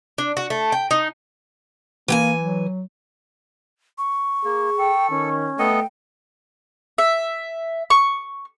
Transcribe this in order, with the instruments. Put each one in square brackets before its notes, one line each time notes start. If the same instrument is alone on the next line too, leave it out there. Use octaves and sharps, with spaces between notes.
[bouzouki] D4
F#4
A3
G5
D#4
[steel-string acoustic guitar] E3 G5 G#5 [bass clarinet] A#3
[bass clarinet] F#3
[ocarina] C#6
[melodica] A#3 [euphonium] G#4
[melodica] A4 [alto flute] G5
[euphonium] D#3 [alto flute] C#4
[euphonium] A3 [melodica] B3 A4 D#5 [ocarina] G5
[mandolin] E5
C#6